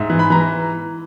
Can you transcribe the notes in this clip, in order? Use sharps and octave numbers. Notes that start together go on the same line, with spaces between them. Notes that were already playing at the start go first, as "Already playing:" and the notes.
Already playing: G#2 E5
E3
B5
E3 A#5